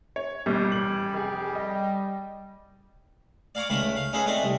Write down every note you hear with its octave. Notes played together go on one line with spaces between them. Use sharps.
C#5
G#1 D#2 B2 G3
A1 F#7
F1 G#4
D#5
D5 F5 G#5 A#5 C#6 D6
C#2 D#3 A3 F5 B5
F5
C#4 D#4 G#4 A4 B4 C#5
A3 C4 D#4 D5 D#5
C2